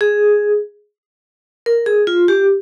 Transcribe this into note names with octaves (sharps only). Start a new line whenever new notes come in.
G#4
A#4
G#4
F4
G4